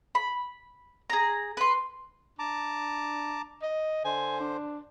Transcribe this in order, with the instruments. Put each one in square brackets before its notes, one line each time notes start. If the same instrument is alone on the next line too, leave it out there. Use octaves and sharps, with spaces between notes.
[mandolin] B5
G#4 A#5
B4 C6
[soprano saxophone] D4 [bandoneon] A5 A#5 D6
[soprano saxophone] D#5
[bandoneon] D3 C5 [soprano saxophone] G#5
[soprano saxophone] D4